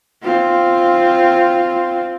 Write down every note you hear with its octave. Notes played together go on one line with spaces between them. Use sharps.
C4 F4